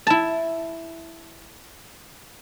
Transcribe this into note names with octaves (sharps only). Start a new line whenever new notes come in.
E4 A5